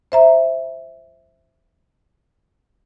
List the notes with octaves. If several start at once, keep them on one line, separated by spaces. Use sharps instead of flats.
C5 E5 A#5